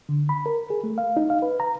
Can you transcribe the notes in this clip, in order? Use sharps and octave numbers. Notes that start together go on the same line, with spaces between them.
D3
B5
A#4
G#4
A3
F5
D#4
F5
B4
A#5